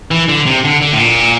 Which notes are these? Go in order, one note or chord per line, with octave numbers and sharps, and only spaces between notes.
E3
D3
C3
D3
D3
A2
A#2